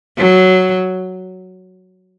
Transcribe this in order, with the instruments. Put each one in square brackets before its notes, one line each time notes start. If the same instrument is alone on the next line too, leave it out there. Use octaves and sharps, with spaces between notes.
[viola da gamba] F#3